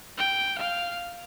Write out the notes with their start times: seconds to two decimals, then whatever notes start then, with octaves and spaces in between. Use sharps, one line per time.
0.18 G5
0.58 F5